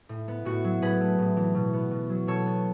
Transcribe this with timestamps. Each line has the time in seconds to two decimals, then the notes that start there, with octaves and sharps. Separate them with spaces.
0.09 A2
0.28 B3
0.45 A2 F#4
0.64 F#3
0.82 A2 G#4 B4
1.01 A3
1.19 A2
1.37 E3
1.55 B2
1.73 B3
1.91 B2
2.10 F#3
2.27 B2 A4 C#5
2.46 B3